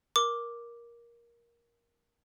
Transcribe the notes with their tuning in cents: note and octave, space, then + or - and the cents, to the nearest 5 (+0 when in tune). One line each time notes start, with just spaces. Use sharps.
A#4 +15 D6 +0